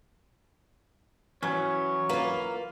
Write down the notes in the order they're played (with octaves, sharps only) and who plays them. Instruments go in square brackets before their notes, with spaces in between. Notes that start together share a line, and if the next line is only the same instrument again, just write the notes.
[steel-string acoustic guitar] E3 [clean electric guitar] F#3 C#4 [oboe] C#5
[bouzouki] A#3 [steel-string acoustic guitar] F4 B4